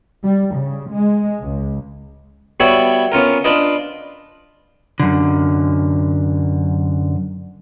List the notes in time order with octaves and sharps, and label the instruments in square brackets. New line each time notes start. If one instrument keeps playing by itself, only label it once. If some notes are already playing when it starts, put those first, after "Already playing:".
[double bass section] G3
C#3
G#3
C#2
[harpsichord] G3 B3 F#4 C#5 E5
B3 C#4 F4 A#4
D4 F4 B4 D#5
[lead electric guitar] F#2 D3